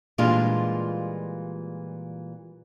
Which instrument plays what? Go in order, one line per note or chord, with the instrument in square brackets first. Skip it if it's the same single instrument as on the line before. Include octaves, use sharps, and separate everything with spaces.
[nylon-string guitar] A#2 E3 G3 G#3 D4 F4